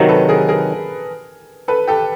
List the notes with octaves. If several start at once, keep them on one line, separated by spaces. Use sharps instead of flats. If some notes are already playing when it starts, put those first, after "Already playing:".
Already playing: C3 D#3 F#3
A4 B4
G#4 A#4
G#4 A#4
A4 B4
G4 A4